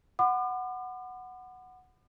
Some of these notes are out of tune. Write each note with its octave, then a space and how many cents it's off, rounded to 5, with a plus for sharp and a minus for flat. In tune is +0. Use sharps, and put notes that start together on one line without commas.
F#5 +0 B5 +40 D6 +45